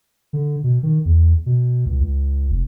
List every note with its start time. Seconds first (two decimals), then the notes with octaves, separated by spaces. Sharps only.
0.33 D3
0.64 B2
0.83 D#3
1.05 E2
1.46 B2
1.86 C#2
2.01 C#2
2.50 F1